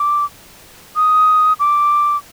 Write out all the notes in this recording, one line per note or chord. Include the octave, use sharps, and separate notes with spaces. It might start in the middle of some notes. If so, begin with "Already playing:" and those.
Already playing: D6
D#6
D6